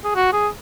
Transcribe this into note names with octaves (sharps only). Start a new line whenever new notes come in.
G#4
F#4
G#4